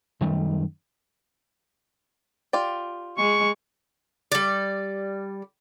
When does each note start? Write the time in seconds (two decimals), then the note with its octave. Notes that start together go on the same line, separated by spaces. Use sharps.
0.21 F#2 D#3 G3 A3
2.53 F4 G4 D5
3.17 G#3 C#6
4.32 G3 D5